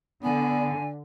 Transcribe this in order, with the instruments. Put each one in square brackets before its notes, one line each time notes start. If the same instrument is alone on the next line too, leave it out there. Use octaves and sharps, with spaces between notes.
[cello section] D3 [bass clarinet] B3 [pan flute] G#5